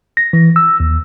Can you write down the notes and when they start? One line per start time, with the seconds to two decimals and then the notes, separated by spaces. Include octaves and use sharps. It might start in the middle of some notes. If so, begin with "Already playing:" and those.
0.17 A#6
0.33 E3
0.56 E6
0.80 D#2